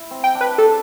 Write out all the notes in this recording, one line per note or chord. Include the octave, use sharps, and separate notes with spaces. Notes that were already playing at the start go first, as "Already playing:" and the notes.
Already playing: E4
C4
G5
D4
B4
D4 A4